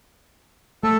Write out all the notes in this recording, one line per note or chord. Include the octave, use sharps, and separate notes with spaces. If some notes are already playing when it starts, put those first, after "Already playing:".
A3 A4